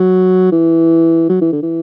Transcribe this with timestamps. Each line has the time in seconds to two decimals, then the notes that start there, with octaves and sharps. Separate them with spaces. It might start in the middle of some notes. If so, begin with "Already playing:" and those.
Already playing: F#3
0.52 E3
1.30 F#3
1.41 E3
1.52 D3
1.62 E3